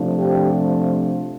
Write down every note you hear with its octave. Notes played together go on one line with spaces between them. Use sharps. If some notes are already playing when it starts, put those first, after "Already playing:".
Already playing: C3 F3 A3 D4
G4